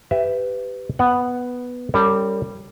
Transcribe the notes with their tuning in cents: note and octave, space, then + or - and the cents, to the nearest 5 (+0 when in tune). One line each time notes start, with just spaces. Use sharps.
G4 +0 B4 +20 E5 +10
B3 +0 F#5 +0
G3 +0 C#4 +0 A#4 -45